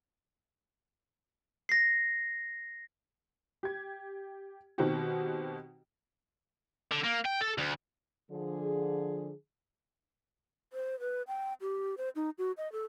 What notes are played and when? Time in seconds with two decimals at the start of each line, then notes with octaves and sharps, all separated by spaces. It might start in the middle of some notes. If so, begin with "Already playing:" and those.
1.69 A#6 C7
3.63 G4 G#6
4.78 B2 D#3 C4 D#4 F#4 G4
6.92 D3
7.04 A#3
7.26 G5
7.41 A4
7.58 D2
8.31 D3 F3 G#4
10.73 C5
11.00 B4
11.28 G5
11.61 G4
11.98 C5
12.16 D#4
12.38 F#4
12.57 D#5
12.72 A4